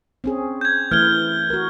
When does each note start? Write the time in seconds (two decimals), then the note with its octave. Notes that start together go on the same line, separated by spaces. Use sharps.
0.24 C4 C#4 G#4
0.61 G6 G#6
0.91 E3 A3 E4 F6 G#6 G7
1.50 F#4 A#4